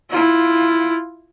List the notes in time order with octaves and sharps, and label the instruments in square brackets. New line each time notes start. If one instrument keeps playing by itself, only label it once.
[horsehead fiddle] E4 F4